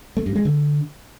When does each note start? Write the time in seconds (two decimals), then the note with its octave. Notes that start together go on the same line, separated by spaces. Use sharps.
0.17 A3
0.26 G2
0.36 G#3
0.45 D3